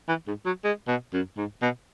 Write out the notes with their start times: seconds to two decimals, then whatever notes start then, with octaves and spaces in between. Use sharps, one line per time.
0.08 E3
0.27 G#2
0.46 F#3
0.64 G#3
0.88 B2
1.13 F#2
1.37 G#2
1.62 B2